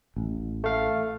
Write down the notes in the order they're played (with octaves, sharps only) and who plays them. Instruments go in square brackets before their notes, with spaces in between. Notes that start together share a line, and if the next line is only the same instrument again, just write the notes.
[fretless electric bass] A1
[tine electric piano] A3 F5